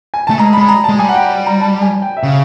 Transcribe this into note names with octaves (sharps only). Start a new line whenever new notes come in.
G#5
A3 A5
G#3 A#5
B5
G#3
A#5
A5
G#3
G3 G#5
F#5
G5
A#5
A5
G#5
G5
E5
C#3 F5